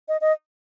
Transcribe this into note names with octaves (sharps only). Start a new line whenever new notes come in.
D#5
D#5